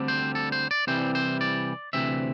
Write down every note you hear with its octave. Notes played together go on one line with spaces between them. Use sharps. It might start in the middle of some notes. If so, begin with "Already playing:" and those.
Already playing: D2 D3 G3 C4
C5
A4
C5
D5
C2 C3 E3 G3 C4 C5
C5
D5
D2 C3 E3 C4 E5